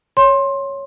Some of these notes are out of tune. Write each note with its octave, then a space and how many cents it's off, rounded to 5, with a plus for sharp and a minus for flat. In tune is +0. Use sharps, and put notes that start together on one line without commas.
C#5 +0 C6 +15